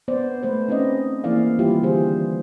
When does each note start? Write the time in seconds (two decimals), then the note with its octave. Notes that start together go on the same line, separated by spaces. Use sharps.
0.08 B3 C5 D5
0.43 A3 B4 C5
0.68 C4 C#4 D#4 G#4 D5 D#5
1.24 E3 A#3 E4 G#4 D5 F5
1.59 D#3 G3 E4 F4 G4
1.83 D3 E3 G#4 C5